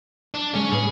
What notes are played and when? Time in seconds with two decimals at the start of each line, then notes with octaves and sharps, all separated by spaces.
0.34 D4
0.55 C#3 G#3 C#4
0.72 A2 G#4 B4